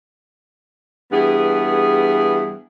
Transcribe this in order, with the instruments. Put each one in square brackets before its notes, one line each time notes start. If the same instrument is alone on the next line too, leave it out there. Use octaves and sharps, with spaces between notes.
[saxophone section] G2 E3 B3 G#4